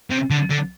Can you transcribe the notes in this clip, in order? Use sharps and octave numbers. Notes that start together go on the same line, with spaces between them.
C3
D3
D3